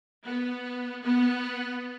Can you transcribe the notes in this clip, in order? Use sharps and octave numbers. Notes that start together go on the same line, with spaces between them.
B3
B3